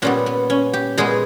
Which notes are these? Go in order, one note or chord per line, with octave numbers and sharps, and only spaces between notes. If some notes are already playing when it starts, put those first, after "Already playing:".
A#2 G3 B3 C#4
B3
C#4
G4
A#2 G#3 B3 G#4